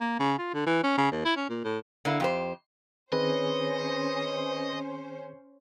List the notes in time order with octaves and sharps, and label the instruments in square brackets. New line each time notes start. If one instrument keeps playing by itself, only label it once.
[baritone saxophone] A#3
C#3
F4
D3
E3
C#4
C#3
D#2
E4
C#4
A#2
A2
[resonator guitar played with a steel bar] D3 A#3 E4
F2 G4 C5
[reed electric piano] D#3 C4 G#4 [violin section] C#4 C5 [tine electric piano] B4 [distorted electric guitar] D#5